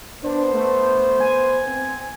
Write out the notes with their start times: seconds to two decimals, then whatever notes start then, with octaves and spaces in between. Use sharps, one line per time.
0.23 B3 D4 C5
0.53 A3
1.20 G#5
1.67 C4